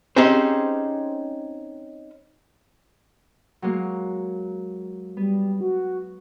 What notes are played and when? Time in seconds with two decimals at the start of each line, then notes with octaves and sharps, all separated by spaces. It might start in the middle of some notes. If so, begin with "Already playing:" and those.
0.16 C4 C#4 D#4 G4 G#4 C5
3.62 F#3 G#3 A#3
5.17 G3 B3
5.61 F#4